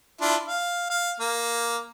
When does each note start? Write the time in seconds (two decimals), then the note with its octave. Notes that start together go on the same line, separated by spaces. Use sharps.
0.21 D4 E4 F4
0.45 F5
0.90 F5
1.20 A#3